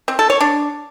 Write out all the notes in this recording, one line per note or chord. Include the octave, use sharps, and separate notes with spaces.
C4
A4
C#5
D4